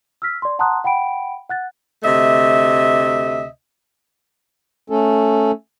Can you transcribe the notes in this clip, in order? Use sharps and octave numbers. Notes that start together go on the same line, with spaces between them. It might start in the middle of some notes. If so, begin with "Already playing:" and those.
E6 F6 B6
D5 C6
F#5 A5 A#5 C6 D#6 F#6
F#5 G5 B5 D7
F#5 F#6 A6
D2 C3 A3 D#5 E5
A3 C#4 A4